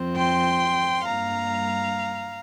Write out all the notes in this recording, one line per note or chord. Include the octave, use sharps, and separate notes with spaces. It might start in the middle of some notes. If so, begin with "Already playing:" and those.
Already playing: F2 F3 C4
G5 C6
G2 G3 A#3 F5 A#5